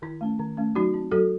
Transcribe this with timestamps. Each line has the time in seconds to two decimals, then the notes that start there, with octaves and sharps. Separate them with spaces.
0.02 D#3 E4
0.21 A3 C#4
0.39 D#3
0.57 A3 C#4
0.75 F#3 D#4 F#4
0.94 C4
1.11 F#3 F#4 A4